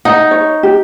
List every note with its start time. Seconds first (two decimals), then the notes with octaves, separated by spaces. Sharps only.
0.05 D#4 F#5
0.31 C#5
0.63 G4